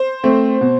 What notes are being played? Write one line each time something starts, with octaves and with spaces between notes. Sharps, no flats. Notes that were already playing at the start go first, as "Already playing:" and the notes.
Already playing: C5
A3 C4
B2